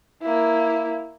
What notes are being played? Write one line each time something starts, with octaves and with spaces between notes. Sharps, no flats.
A#3 E4